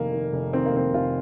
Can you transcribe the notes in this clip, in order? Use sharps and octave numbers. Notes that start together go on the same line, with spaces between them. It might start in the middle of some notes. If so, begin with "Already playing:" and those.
Already playing: F1 D#3 A#3
D#3
F1
D#3 C4
A#3
F1 C4
F1 F4